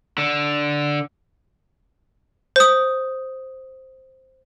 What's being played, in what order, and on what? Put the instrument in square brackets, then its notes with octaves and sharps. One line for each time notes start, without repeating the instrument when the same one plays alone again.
[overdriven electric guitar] D3
[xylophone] C5 D#6